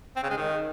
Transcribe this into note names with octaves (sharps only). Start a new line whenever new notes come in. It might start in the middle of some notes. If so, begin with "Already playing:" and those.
C4
C#3
G#3
D#3